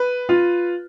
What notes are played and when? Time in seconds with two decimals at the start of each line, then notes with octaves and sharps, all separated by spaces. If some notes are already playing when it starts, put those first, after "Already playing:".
Already playing: B4
0.29 F4